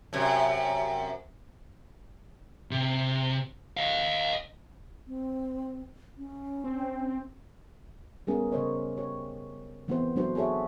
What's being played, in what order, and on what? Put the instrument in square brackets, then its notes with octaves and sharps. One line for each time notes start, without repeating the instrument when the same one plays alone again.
[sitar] F#2 C3
[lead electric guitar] C3
D#5 F5
[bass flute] C4
C#4
[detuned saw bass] C4
[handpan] G3 A3 B3 C#4 G#4 A#4
C#3 A#4 C5 C#5 D#5
G4 C#5
E3 A3 B3 C4 G4 C5
F#3 A3 D4 F#4 C5
F#4 G#4 A4 C#5 E5